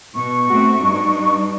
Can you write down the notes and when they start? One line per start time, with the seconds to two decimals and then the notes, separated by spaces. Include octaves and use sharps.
0.15 B2 C#6
0.50 A3 C4 F#4
0.83 G2 D4 D#4